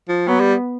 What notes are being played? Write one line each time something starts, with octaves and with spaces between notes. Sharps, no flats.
F3
F#3 B3
G3